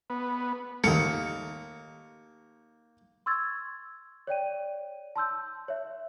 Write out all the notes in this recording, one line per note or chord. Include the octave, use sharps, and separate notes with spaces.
B3
D#2 A3 A#3 C#7
C6 C#6 E6 G#6 A6
C#5 D5 G5 D#7
A5 C6 E6 G6
C#5 E5